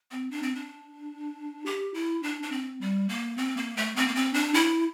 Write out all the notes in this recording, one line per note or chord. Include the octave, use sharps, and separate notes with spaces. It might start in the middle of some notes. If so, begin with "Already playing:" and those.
C4
D4
C4
D4
G4
E4
D4
D4
C4
G3
A#3
C4
A#3
A3
C4
A#3
C4
D4
E4